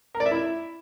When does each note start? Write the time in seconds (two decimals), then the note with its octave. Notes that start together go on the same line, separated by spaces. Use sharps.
0.15 A#4
0.20 D5
0.26 E5
0.31 E4